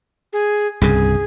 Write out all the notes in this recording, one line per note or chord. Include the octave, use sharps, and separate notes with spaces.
G#4
C2 G2 C#3 G#4